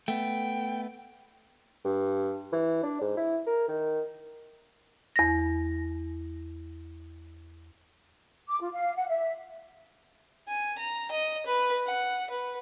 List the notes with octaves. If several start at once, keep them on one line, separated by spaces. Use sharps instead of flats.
A3 B3 G5
G2
E3
D4
G#2
E4
A#4
D#3
E2 A#6
D6
F4
F5
F#5
E5
G#5
A#5
D#5
B4
F#5
B4